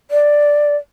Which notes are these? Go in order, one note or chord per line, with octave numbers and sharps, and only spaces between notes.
D5